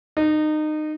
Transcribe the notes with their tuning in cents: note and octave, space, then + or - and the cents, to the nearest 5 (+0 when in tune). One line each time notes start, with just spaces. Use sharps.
D#4 -25